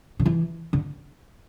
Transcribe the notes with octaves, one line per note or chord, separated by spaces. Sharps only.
D3
E3
D3